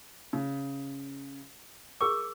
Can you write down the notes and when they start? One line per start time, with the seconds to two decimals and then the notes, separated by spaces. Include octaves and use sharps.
0.33 C#3
2.01 G#4 A#4 C#6 D6